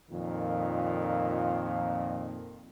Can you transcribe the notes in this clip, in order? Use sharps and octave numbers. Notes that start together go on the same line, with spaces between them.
F2 A#2 D#3